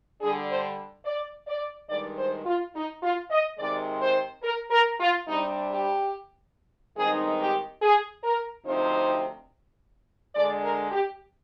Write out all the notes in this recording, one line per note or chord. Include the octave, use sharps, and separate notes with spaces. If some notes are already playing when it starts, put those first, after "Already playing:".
D3 G3 D4 G#4
C5
D5
D5
G2 D#3 G#3 D5
C5
F4
D#4
F4
D#5
C3 D#3 G#3 C4 D5
C5
A#4
A#4
F4
C3 G3 D4 D#4
G4
G2 D#3 G#3 C4 D#4 G#4
G4
G#4
A#4
D2 C3 F3 C4 D#4 C5
D3 G#3 D4 D5
A#4
G4